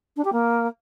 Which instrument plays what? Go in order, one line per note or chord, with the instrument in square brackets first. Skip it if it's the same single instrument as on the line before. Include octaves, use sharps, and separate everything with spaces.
[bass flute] D4
G4
A#3